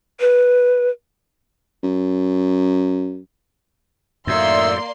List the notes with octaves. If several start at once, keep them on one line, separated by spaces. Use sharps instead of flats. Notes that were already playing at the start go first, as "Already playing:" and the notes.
B4
F#2
F#2 A2 D#3 A#3 D5 E5 C6 E6